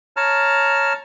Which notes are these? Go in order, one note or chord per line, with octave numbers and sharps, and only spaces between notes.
C#5 A5 A#5 F6